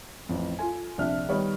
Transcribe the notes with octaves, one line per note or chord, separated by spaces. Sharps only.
A1 F2
F4 A4 G#5
A#1 C3 D4 E5 F6
D#3 G3 B3 C#5 D#5